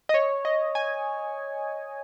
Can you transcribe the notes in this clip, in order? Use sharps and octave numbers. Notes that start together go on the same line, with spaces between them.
D#5
C#5
D#5
G#5